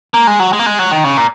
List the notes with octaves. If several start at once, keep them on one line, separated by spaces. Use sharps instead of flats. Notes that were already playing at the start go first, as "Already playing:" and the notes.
A#3
G#3
F#3
G#3
A#3
G#3
F#3
D#3
C#3
A#2